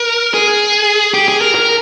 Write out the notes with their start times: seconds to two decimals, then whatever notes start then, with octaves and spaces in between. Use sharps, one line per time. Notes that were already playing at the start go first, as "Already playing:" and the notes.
Already playing: A#4
0.34 G#4
1.14 G4
1.28 G#4
1.41 A#4
1.55 A#4